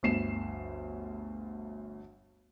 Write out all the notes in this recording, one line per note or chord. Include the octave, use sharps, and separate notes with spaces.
G1 D2 C7 E7